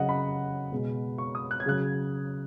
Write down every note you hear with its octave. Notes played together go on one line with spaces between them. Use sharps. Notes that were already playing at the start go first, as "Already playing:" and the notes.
Already playing: C#3 F#3 D#5 F#5
B5
B2 G#3
C#6
D#6
F#6
G#6
C#3 F#3 F#6